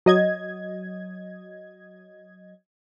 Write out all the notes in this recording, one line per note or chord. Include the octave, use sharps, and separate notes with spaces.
F#3 D#5 G#6